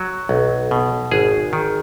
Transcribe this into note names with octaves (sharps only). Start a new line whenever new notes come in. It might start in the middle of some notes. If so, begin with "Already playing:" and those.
Already playing: F#3
B1
B2
G#1 G#4
D#3